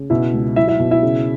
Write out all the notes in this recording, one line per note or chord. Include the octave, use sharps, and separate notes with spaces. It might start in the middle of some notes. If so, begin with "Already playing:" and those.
Already playing: C#3
B2 E4 E5
C#2
F#3 E4 E5
E4 E5
B2
E4 E5
C#3